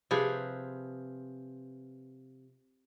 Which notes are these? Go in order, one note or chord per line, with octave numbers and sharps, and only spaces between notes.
C3 F3 G#4 B4